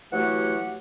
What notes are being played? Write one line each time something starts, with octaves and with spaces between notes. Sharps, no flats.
E3 F#3 A3 G4 F#5